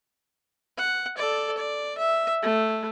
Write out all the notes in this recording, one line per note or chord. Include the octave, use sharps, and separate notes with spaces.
F#5
A4 D5
D5
E5
A3